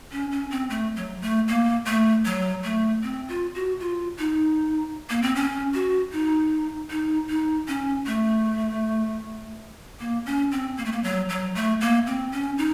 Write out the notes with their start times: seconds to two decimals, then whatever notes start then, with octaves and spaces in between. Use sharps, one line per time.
0.12 C#4
0.32 C#4
0.51 C4
0.70 A3
0.96 F#3
1.22 A3
1.48 A#3
1.87 A3
2.25 F#3
2.64 A3
3.03 C4
3.29 F4
3.55 F#4
3.80 F4
4.19 D#4
5.10 A#3
5.22 C4
5.35 C#4
5.74 F#4
6.12 D#4
6.90 D#4
7.29 D#4
7.68 C#4
8.06 A3
10.00 A#3
10.26 C#4
10.52 C4
10.77 A#3
10.85 A3
10.92 A#3
11.04 F#3
11.29 F#3
11.55 A3
11.81 A#3
12.07 C4
12.32 C#4
12.58 D#4